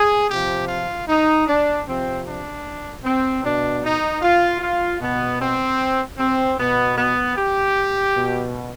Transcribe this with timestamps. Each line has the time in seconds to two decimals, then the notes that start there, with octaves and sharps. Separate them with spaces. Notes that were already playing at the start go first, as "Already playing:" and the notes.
Already playing: G#4
0.29 C3 F3 G4
0.68 F4
1.08 D#4
1.47 D4
1.86 C3 F3 C4
2.25 D4
3.04 C4
3.43 B2 D4
3.83 D#4
4.22 F4
4.61 F4
5.00 B2 B3
5.40 C4
6.18 C4
6.58 B2 B3
6.97 B3
7.36 G4
8.15 B2